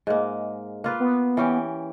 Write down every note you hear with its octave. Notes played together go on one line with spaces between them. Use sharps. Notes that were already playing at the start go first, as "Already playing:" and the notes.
G#2 G#3 A#3
A#3 F4 B4
B3
E3 C#4 G4